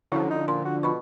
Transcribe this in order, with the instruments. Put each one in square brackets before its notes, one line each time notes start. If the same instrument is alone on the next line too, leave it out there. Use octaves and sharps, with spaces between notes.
[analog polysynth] D3 F3 [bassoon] F#3 [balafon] C#4 E4
[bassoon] D#4
[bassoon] A#2 [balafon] C6
[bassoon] F#4
[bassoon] B2 [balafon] F4 B5 C#6